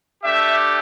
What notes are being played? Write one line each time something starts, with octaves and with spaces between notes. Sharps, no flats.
A3 D4 G4 E5